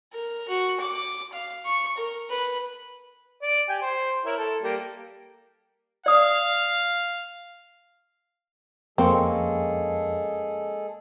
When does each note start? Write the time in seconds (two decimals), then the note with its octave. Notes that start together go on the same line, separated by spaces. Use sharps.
0.12 A#4
0.48 F#4
0.79 D6
1.32 F5
1.65 C#6
1.97 A#4
2.30 B4
3.42 D5
3.69 G4 G5 G#5
3.82 C5
4.25 E4 A#4 C#5
4.38 A4
4.63 G3 A#3
6.06 D5 F5 D#6
8.98 F2 G#3 A#3 C4 C#4 G#4 A4